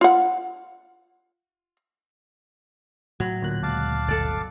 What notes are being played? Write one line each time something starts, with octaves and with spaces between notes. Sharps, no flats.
F4 F#5
A2 F#3
D2 A#2 F#6
C#3 G#3 F5 A5 D6
G1 B2 A4 D5